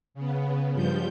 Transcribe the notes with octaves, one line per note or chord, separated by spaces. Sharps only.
C#3 B3
G2 F3 G3 G6